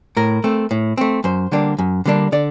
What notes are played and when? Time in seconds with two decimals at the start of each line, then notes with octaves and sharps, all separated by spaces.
0.17 A2 A#4
0.44 A3 C4
0.71 A2
0.97 A3 C4
1.24 F#2 C5
1.52 D3 G3 A#3 D4
1.79 F#2
2.05 D3 G3 A#3 D4
2.32 D3 D5